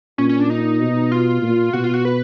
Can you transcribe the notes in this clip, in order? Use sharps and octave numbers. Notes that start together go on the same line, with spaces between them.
A#2 C#4
C#4
D4
D#4
B2
F4
A#2
B2 F#4
F4
F#4
B4